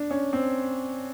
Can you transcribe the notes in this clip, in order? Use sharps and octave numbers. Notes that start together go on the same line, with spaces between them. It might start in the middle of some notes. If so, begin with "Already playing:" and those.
Already playing: D4
C#4
C4